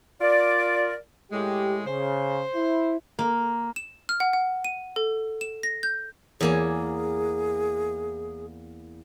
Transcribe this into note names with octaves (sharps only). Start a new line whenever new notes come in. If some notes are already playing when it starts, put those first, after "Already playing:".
F4 A#4 D5
A2 G#3 G4
C#3 C5
E4
A#3
E7
F6
F#5
F#5
D#7
A4
E7
A#6
G6
E2 A#3 G#4 G#5